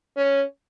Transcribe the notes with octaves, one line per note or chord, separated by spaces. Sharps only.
C#4